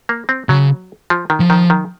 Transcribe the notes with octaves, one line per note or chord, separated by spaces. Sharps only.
A#3
C4
C#3 F#3
F3
D#3
F3
D#3
D#3